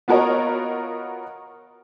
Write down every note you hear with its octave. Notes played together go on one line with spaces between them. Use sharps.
B3 F4 F#4 A#4 C#5 D#5